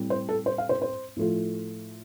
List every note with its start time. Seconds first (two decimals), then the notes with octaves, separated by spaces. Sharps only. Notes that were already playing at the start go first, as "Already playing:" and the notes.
Already playing: A2 G3 C4
0.10 C5
0.29 A4
0.46 C5
0.58 F5
0.69 C5
0.82 C5
1.17 A2 F3 A3 F4